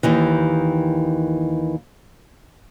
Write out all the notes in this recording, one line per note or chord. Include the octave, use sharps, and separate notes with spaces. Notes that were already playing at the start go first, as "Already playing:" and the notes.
D#2 D#3 E3